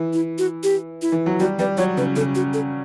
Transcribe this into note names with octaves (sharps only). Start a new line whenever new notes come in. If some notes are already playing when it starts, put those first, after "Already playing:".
Already playing: E3
E4
F#4
G4
E4
E3
F#3
G3 F#4
G3 B4
F#3 C#5
C#3 B4
C#3 A4
F#4
A4